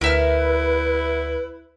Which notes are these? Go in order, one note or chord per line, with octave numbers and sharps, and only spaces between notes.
D2 E4 A#4 B4 E5 F6